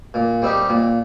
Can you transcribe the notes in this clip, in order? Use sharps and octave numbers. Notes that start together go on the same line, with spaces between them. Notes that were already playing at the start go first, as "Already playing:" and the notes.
A#2
G3 C4 D#4 G4
A#2